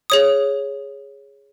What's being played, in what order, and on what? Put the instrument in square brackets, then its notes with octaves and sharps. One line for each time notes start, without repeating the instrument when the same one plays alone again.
[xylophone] G#4 C#5 D#6